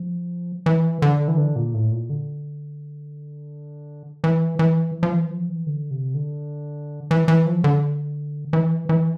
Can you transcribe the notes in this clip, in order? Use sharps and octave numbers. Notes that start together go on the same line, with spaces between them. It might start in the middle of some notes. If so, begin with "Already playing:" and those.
Already playing: F3
E3
D3
E3
D3
A#2
A2
A#2
D3
E3
E3
F3
E3
F3
E3
D3
C3
D3
E3
E3
F3
D3
E3
E3